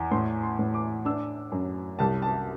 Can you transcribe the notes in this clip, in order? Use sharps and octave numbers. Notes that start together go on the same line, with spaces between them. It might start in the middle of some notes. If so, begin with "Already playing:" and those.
Already playing: E2
A2 C6
C6
A2
D6
D4 E6
F#2
C2 A5
A5